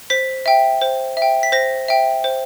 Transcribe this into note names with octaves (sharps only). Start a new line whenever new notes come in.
C5 B6
E5 G5
C5
E5
G5
B6
C5 A#6
E5 G5
C5